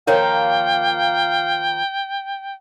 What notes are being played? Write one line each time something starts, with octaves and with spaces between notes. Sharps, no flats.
D#3 F3 A#3 A#4 C#5 F5 G5